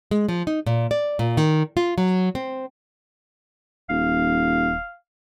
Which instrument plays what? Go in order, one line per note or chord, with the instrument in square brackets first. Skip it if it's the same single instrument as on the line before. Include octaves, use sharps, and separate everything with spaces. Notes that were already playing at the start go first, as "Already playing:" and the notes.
[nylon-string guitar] G#3
F3
D#4
A#2
D5
A#2
D#3
F4
F#3
C4
[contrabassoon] D#1 [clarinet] F5